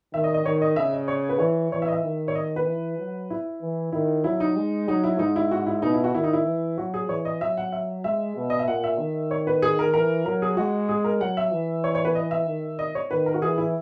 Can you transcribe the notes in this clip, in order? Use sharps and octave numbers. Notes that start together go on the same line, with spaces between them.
D#3 E5
D#5
D#5
D#3 C#5
D#5
C#3 E5
D#5
C#5
B4
E3 C#5
E3 C#5
E5
D#5
E5
D#3
C#5
D#5
B4
E3
F#3
E4
E3
D#3 E4
F#3 E4
D#4
G#3
F#3 D#4
E4
G#2 D#4
E4
F#4
E4
B2 D#4
E4
F#4
D#3 E4
D#4
E4
E3
F#3 F#4
G#4
E3 C#5
D#5
F#3 E5
F#5
E5
G#3 E5
B2
D#5
E5
A#2 F#5
E5
D#3
C#5
B4
G#4
A#4
E3 A#4
F#3 A#4
G#4
G#3 F#4
G#4
A#4
F#3 F#5
E5
E3
C#5
C#5
B4
D#5
E5
D#3
D#5
C#5
D#3 B4
A#4
F#4
E3 G#4
E4